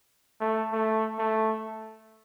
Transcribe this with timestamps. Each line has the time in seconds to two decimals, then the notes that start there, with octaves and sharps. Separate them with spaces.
0.41 A3
0.72 A3
1.19 A3